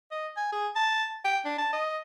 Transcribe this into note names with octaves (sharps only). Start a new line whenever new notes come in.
D#5
G#5
G#4
A5
G5
D4
A5
D#5